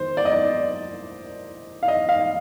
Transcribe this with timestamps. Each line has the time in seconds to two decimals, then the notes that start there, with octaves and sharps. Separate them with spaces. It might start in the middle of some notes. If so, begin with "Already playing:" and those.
Already playing: D#3 C5
0.17 D5
0.25 D#5
0.32 D5
1.83 F5
1.88 D#5
2.09 F5